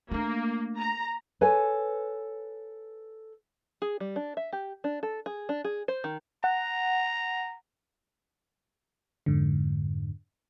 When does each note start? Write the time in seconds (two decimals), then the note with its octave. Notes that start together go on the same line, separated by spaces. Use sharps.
0.12 A3 A#3 D4
0.78 A#5
1.41 A4 B4 C#5 G#5
3.82 G#4
4.00 G3
4.16 D4
4.37 E5
4.53 G4
4.84 D4
5.03 A4
5.26 G#4
5.49 D4
5.65 G#4
5.88 C5
6.04 D#3
6.44 F#5 A#5
9.26 F2 G#2 D3